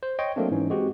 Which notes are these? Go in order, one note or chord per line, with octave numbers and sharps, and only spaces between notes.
C5
C#5 D#5 G5 C6 C#6
F#3 A3 A#3 C4 D4
G#2 E3 C#4 D#4
G#3 C4 F#4 G4